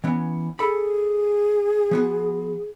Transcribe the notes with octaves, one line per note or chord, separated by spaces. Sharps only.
E3 B3 C#4
G#4 A4 B5
F3 B3 F#4